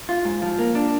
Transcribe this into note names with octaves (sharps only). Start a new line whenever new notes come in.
F4
G#2
F3
A#3
D4